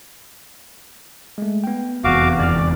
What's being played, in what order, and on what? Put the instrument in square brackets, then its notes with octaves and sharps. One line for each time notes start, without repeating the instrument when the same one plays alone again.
[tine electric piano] G#3 A3
B3 G5
[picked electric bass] F1 E2 [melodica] F#4 F5 D6
[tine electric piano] G1 E3 F6 [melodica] D5